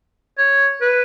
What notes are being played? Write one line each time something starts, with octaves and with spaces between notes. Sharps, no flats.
C#5
B4